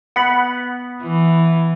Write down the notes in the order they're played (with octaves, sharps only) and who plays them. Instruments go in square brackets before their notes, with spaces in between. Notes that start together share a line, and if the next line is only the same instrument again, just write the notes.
[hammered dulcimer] B3 [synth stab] F#5 B5
[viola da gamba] E3